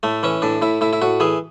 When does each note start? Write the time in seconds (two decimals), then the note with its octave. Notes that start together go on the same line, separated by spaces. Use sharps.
0.03 A2 A3
0.23 E3 C#4
0.42 A2 D4
0.62 A2 E4
0.81 A2 E4
0.93 E4
1.02 A2 F#4
1.20 E3 G#4